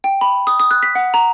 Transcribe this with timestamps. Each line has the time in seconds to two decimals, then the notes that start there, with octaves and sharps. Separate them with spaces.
0.04 G5
0.21 B5
0.47 D#6
0.60 D#6
0.71 F#6
0.83 B6
0.95 F#5
1.14 A#5